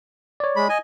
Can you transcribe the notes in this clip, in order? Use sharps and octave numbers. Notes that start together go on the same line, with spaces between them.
C#5 D5
G#3 B5
D#5 G#5